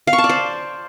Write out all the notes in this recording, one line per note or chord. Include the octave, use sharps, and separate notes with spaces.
F5
C#6
A5
D5
C5